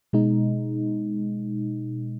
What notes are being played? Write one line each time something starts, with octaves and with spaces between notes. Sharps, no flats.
B2 G#3 D#4